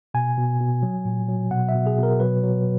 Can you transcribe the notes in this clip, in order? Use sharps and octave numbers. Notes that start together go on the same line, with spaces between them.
B2 G#5
B2
B2
F#3
A#2
F#3
B2 F#5
E5
B2
G#4
B2
A#4
F#3 B4
F#3